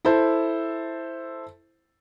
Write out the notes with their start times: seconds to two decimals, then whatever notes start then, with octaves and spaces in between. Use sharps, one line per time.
0.05 E4 A4 C5